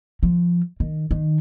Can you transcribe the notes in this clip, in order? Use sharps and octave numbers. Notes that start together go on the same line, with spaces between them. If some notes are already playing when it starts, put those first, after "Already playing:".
F3
D#3
D#3